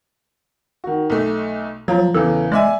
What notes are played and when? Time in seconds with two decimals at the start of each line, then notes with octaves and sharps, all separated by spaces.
0.84 D#3 F#4
1.10 B1 A3
1.88 F3 F#3 A#5
2.14 E2 C#3 E3 A4
2.52 G#3 D5 E5 G#5